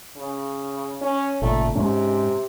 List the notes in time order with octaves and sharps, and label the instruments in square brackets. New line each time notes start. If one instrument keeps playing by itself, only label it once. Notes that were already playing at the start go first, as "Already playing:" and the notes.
[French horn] C#3
C#4
[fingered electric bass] G#1 A#2 C#3 [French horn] A3
[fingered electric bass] G#2 G#3 C#4 [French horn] C3